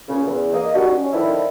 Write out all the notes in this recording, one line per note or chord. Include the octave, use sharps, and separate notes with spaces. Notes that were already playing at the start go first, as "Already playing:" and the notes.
A#2 C#3
E2
A#3 D#5
G3 D4 D#4 F#4
C#4
D3 D#3 F3 D4 E4